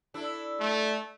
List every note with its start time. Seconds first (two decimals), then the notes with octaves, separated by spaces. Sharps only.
0.14 D4 E4 A4
0.60 A3